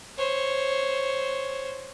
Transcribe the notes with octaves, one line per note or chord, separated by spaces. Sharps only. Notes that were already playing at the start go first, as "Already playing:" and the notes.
C5 C#5